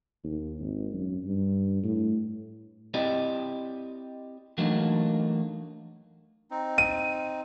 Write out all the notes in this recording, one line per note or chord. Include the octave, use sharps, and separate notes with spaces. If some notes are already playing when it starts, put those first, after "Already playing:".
D#2
G#1
F#2
G2
A2
C4 E4 G4 D5 D#5
E3 F#3 A3 A#3 D4 D#4
C4 D#4
D#7